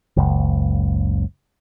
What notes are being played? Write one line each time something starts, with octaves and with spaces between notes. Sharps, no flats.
F#1 C#2